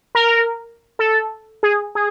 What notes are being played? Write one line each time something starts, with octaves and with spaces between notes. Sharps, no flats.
A#4
A4
G#4
G#4